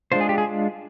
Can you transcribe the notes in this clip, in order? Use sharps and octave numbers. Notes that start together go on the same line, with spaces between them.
G#3 D4 F4 C5
G#4
G4
G#4